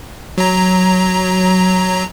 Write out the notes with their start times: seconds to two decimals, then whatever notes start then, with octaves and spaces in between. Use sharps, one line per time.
0.38 F#3 A#5